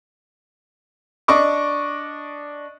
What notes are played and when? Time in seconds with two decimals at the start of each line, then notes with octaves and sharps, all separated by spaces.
1.28 D4 D#5 C#6 D6